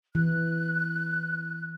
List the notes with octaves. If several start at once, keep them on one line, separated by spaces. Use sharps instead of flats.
E3 F#6